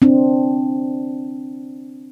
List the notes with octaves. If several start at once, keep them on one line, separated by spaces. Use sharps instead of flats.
C4 D4